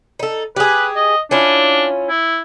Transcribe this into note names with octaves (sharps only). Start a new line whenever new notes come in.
D#4 A4
G4 G#4 B4
D#5
C#4 D4 E4 F4
E4